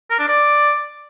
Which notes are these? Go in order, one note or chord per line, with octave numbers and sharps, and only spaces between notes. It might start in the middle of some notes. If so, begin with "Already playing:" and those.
A#4
D4
D5